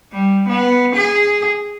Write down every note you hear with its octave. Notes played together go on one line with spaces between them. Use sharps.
G3
B3
G#4